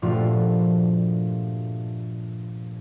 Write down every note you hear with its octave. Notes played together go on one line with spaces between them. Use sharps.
G2 A#2 F3 A3 F4 F#4